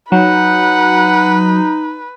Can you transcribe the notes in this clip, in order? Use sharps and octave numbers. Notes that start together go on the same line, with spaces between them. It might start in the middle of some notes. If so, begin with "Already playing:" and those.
F#3 D#4 B4 F#5